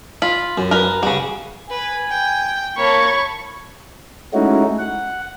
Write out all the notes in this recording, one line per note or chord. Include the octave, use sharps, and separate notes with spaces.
F4 B5
F#2
A#4 B4
C#3 G3 F#4
B4 G#5
G5
A#3 C#5 A5 B5 C#6
G#3 A3 C#4 D#4 E4 F#4
F#5